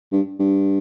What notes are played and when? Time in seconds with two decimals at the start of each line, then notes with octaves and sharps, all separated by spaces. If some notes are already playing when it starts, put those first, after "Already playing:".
0.12 G2
0.39 G2